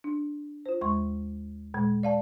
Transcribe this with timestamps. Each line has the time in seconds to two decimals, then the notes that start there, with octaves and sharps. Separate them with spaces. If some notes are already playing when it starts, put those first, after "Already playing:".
0.04 D4
0.66 F4 C5
0.81 D#2 G#3 C6 C#6
1.74 A#2 G#3
2.03 D5 F5 A5